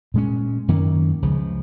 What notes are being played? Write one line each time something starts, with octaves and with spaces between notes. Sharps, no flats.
A#2 G#3 C#4
F#2 D#3 A#3 C#4
C#2 C#3 F3